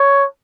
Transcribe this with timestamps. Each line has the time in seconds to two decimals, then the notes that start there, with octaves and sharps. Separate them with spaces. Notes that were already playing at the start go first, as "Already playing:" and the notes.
Already playing: C#5